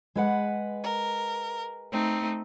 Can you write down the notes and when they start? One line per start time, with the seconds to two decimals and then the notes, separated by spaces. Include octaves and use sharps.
0.15 G#3 B4 F#5
0.84 A#4
1.92 A3 C4 D#4